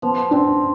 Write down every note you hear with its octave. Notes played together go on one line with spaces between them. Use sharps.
F3 B3
C4 D4